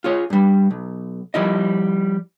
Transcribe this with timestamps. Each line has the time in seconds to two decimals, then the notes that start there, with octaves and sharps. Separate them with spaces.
0.04 F4 G#4 C#5
0.30 G2 G3
0.71 B1
1.34 F3 G3 E4 D#5